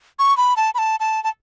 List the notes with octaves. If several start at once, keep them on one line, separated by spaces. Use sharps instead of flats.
C#6
B5
A5
B5
A5
A5
A5